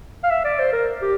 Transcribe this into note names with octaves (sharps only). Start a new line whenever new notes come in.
F5
E5
D5
C5
A#4
G4